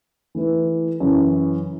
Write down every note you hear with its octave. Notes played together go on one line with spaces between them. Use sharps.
E3 A3 E4 B4
F#2 C#3 E3